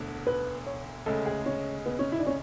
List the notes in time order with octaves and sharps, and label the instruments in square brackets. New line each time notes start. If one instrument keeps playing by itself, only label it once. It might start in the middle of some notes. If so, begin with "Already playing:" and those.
Already playing: [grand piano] E1 D2 D3
[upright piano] B4
C#5
[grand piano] D2 C#3 G#3 [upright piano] A4
[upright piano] G#4
C#4
B3
C#4
E4
D4
C#4